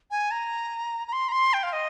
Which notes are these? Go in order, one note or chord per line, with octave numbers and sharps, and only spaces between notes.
G#5
A#5
A#5
C6
A#5
C6
G5
F5
D#5